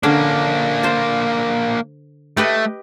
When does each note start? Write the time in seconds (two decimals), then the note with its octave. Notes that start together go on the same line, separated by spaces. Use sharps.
0.03 D3 A#3 C#4 D4
0.83 C5 A5
2.37 A3 G4 B4 D#5